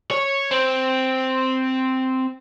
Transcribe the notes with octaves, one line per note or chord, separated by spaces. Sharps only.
C#5
C4